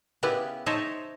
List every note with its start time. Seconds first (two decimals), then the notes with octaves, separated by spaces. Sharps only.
0.23 C#3 B3 E4 G4 B4
0.66 D#4 C5 C#5 E5 G5 A5